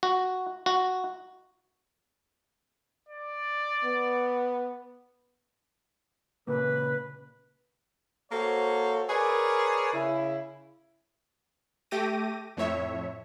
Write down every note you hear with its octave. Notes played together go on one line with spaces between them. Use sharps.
F#4
F#4
D5
B3
A#2 C#3 A#3 B4
A#3 F#4 A4 C5 C#5
G#4 A#4 B4 C#5 D5 G#5
C#3 E4
A3 G4 G5 D6 A#6 D#7
F2 A2 C#5 E5